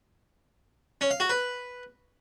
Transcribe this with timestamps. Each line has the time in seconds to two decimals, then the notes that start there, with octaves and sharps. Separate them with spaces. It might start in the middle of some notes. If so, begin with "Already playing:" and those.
1.01 C#4
1.11 F5
1.20 F#4
1.30 B4